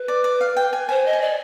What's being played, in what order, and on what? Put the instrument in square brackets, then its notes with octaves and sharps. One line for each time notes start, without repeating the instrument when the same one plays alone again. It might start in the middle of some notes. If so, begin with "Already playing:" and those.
Already playing: [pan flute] B4
[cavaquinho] D5
D5
F5
G5
G#5
[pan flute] C5 [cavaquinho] G#5
[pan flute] D#5
[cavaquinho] G#5
[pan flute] D5